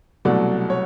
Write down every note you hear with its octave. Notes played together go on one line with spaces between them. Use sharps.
C2 B2 F#3 A3 D5
C#5